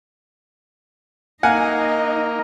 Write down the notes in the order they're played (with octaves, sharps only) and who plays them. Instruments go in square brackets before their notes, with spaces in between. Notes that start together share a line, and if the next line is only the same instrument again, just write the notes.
[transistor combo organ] A#3 [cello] D#4 D#5 [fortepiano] F5 F#5 G#5